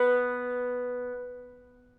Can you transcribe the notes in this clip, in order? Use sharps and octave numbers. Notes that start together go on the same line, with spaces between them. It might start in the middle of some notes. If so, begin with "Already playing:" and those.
Already playing: B3